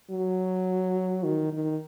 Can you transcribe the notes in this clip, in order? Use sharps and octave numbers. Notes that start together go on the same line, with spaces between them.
F#3
D#3
D#3